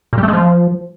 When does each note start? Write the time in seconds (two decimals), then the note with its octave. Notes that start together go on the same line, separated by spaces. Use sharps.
0.13 A#2
0.18 G3
0.23 A3
0.28 G#3
0.33 F3